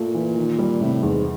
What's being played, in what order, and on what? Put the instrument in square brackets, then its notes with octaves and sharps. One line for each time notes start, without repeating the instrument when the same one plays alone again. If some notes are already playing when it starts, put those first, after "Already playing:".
Already playing: [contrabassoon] A#2 [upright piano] A3 F4
[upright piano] E3
D#3
G3
[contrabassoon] A2 [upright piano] C3
[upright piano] E2 [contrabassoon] G#2